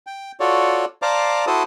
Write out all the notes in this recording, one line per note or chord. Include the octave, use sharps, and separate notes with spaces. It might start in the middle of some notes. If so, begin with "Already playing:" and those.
G5
F4 F#4 A4 C#5 D5
C5 D5 F5 A5 A#5 D6
E4 F#4 A4 C5 A5 D#6